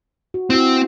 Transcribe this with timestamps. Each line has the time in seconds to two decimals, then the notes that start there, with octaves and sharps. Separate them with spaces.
0.34 F#4
0.50 C4 E4 F#4